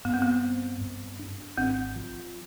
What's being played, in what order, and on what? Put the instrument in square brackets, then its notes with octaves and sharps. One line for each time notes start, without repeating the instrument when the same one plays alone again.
[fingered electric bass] G2 [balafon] B3
[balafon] C4
B3
[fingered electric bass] C4
G2
D4
[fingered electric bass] G#1 [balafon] C4
[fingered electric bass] F3